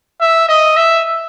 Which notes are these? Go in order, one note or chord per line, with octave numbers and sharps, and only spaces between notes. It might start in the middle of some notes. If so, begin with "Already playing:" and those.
E5
D#5
E5